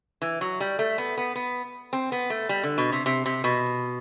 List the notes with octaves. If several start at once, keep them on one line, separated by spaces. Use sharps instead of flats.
E3
F#3
G3
A3
B3
B3
B3
C4
B3
A3
G3
D3
B2
C3
C3
C3
B2